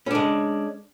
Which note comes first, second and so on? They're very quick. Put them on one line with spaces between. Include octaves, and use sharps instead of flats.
C#4 D4 G#3